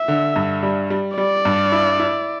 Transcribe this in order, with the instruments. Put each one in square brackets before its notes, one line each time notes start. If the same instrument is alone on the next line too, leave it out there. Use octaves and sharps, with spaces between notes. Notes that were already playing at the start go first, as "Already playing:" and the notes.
Already playing: [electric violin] E5
[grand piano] D3
G2
G3
G3
[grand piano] G3 [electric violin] D5
[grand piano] G2
E4
E4